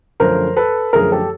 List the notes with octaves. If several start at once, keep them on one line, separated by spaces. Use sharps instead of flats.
F#2 D3 F3 A3 A#4 C5
A4 B4
F#2 D3 F3 A3 G#4 A#4
G4 A4